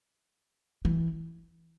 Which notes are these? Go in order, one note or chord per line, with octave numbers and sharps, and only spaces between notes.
E3